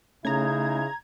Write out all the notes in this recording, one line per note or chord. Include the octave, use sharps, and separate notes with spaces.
C#3 A3 C#4 D#4 E4 G#4 A#5 G#6